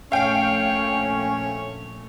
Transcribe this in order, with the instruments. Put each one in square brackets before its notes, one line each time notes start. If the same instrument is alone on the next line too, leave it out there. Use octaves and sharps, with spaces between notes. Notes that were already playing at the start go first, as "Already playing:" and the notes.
[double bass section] A#1 A3 [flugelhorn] C#4 [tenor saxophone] C#5 [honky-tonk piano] F5 G5